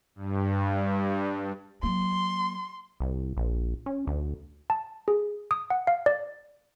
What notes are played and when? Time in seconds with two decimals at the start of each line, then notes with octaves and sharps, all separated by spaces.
0.15 G2
1.83 F#3 A#3 C6
3.00 C2
3.37 A#1
3.86 C#4
4.07 D2
4.70 A5
5.08 G#4
5.51 D#6
5.70 F#5
5.87 F5
6.06 D5